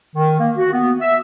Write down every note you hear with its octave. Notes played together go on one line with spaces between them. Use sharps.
D#3
A#3
F#4
B3
E5